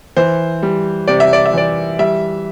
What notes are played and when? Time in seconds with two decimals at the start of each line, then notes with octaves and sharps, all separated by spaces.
0.17 E3 C5
0.63 G3
1.08 C3 D5
1.20 E5
1.33 D5
1.46 E5
1.53 E3 D5
1.99 G3 E5